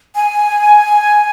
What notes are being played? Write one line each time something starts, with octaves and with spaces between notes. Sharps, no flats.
G#5